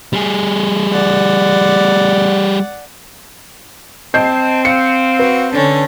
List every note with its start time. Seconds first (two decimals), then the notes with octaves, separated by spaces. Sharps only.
0.13 G3 G#4
0.92 D5 F#5
4.14 C4 D#5 A5 G6 C7
4.65 F5 C#7
5.19 F#4 B4
5.54 D3 C#4 A4